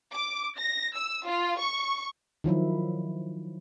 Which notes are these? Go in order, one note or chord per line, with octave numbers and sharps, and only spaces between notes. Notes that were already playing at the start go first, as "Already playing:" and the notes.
D6
A#6
E6
F4
C#6
D#3 F3 F#3 E4